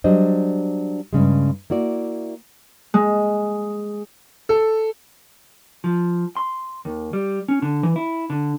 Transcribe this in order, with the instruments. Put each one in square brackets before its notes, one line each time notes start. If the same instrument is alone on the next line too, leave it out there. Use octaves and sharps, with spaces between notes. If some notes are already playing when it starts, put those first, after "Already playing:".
[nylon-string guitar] F#3 G3 D4 C5 D#5
G2 C#3 G#3
A#3 E4 F#4 D5
[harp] G#3
[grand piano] A4
[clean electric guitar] F3
C6
D#2
G3
C#4
D3
E3
E4
D3